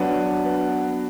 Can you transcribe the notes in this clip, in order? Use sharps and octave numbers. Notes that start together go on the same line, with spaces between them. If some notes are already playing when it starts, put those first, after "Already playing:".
Already playing: F#3 B3 D4 F#4
B3